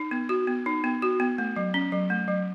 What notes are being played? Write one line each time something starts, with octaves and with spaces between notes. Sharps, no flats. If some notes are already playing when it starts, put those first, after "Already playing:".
Already playing: D#4
B3
F#4
B3
D#4
B3
F#4
B3
A3
F#3
C#4
F#3
A3
F#3